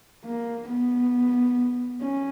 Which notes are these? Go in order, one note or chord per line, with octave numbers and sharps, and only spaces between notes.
A#3
B3
C#4